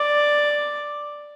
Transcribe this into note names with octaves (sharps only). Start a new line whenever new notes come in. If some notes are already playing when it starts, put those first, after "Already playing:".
Already playing: D5